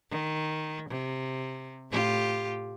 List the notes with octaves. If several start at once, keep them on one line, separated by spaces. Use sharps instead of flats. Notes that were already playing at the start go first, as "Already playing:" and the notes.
D#3
C3
A2 F4 G4